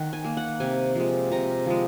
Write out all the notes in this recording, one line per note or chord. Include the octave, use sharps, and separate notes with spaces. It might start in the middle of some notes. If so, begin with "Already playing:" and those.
Already playing: D#3 F#5
G#5
A#3
F#5
C3 G#5
F3 G#3
C3 A#5
F3 G#3